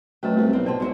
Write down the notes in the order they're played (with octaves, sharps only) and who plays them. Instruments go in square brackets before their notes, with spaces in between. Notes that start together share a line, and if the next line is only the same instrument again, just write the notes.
[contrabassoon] F#3 [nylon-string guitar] A3 [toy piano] C#4 B4 D#5
[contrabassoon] C2 [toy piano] C#4
[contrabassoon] B1 [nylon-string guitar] C4
[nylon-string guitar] C5 G5 [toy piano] D5 A5 C6
[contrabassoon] G#2 [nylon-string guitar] F#3 F#4 E5